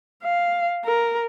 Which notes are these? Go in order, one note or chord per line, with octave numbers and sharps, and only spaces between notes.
F5
A#4